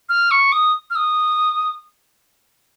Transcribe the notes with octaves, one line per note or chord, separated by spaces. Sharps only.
F6
C#6
D#6
F6
D#6